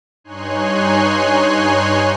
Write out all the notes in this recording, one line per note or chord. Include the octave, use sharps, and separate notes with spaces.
G2 D#4 C#5 G#5 C6 F#6